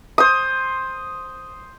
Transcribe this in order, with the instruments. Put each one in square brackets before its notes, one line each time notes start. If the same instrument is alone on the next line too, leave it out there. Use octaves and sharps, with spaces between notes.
[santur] C5 D#6